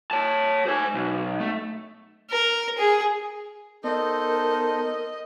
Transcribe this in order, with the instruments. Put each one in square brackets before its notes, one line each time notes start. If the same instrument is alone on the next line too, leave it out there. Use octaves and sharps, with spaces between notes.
[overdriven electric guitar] C#5 A5
C5 G#5
B1
A3
[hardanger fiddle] A#4
G#4
[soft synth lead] B3 [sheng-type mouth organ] D#4 A4 C5 [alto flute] A#4 [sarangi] D#5